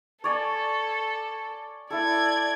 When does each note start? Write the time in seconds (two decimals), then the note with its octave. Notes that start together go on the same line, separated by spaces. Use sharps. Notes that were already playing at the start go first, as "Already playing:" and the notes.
0.24 A4 C#5 D5 G#5
1.91 E4 A4 D5 G#6